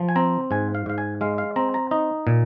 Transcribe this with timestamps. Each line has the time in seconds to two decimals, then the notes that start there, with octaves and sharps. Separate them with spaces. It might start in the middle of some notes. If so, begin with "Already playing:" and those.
Already playing: F3
0.09 G#5
0.16 C4 A#5
0.51 G#2 G#5
0.75 F5
0.86 G#2 F5
0.98 G#5
1.21 G#3 F5
1.38 F5
1.56 C4 A#5
1.74 A#5
1.91 D#4 D#5
2.27 A#2